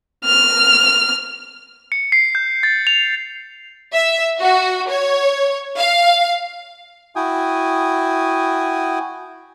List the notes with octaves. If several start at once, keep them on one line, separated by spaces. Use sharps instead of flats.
F6
C#7
C7
G6
A6
F7
E5
F#4
C#5
F5
E4 F#4 G5 G#5 D#6